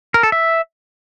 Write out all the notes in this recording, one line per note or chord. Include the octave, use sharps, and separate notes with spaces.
A#4
A4
E5